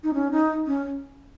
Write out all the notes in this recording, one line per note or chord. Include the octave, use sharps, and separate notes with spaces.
D#4
C#4
D#4
C#4